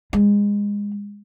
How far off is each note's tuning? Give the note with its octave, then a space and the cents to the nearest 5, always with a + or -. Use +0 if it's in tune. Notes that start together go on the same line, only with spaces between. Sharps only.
G#3 -25